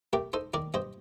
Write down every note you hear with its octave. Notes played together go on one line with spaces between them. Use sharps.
A3 G4 A#4
D#4 A4 C5
D#3 A#4 D5
G2 C5 D#5